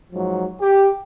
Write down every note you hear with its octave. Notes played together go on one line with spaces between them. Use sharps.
G#2 F3 F#3
G4